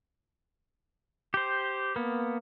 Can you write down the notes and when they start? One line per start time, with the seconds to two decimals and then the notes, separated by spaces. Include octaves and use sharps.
1.34 G4 C5
1.96 A#3 B3